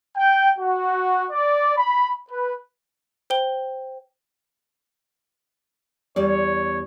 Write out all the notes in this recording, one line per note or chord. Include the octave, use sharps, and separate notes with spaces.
G5
F#4
D5
B5
B4
C5 G5 G7
E2 G3 C#5 D5